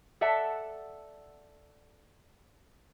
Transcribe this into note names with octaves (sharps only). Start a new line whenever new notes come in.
A4 D5 E5 F#5 A5